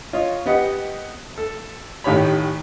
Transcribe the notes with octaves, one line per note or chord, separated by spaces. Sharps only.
F4 C#5 D#5
B3 G4 D#5 F#5
A4
A1 D#3 G4 C#5 B5